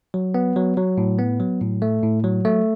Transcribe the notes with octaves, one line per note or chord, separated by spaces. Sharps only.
F#3
B3
F#3
F#3
A2
B3
F#3
A2
A3
A2
F#3
A3